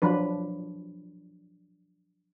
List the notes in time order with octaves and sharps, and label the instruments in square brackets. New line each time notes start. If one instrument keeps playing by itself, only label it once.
[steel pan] F3 F#3 D4 B4